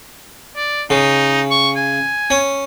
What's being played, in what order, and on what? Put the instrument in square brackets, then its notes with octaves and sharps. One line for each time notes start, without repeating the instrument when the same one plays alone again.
[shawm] D5
[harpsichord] C#3 [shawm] D#4
[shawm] C#6
G#5
[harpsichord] C#4